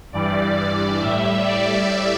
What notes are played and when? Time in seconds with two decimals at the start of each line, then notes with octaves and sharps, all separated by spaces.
0.13 G2 E3 G3 D5
0.57 D5
1.01 A2 G3 E5
1.45 D5